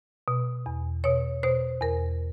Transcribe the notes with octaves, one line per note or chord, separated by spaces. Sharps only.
B2
E2
B2 C#5
B2 C5
E2 A#4